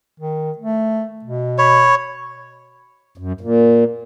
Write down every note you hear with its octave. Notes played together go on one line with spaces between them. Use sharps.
D#3
A3
B2
C#5 B5
F#2
A#2